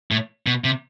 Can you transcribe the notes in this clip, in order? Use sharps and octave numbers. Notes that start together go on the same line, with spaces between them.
A2
B2
C3